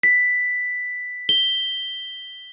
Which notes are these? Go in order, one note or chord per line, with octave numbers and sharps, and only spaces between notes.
B6
G7